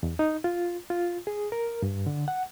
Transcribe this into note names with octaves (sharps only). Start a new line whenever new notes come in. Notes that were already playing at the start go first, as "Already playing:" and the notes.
E2
D#4
F4
F4
G#4
A#4
G2
D3
F#5